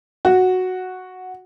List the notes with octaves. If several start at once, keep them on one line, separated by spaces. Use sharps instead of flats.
F#4